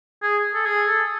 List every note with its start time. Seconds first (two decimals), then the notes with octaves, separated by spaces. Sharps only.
0.22 G#4
0.54 A4
0.66 G#4
0.87 A4